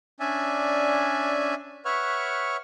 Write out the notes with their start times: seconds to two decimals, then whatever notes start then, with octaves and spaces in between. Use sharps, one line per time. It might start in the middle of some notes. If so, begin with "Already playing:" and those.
0.20 C#4 D4 D5 E5 G#5
1.85 B4 C#5 E5 F#5 C#6 F6